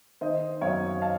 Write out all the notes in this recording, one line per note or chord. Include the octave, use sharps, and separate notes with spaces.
D#3 C5 D#5
F#2 C#5 F5
F5 A5